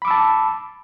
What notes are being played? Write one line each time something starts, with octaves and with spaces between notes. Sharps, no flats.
A5 B5 D6 E6